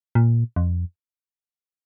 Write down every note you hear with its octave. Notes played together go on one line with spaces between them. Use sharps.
A#2
F2